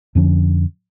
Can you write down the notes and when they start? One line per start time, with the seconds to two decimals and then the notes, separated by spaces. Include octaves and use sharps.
0.15 F2 D3 F3 C#4